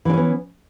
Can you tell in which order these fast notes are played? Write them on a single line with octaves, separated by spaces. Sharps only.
E3 D4 C#4 B3